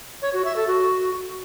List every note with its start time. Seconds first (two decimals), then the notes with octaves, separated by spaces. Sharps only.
0.22 C#5
0.33 F#4
0.45 E5
0.56 A4
0.67 F#4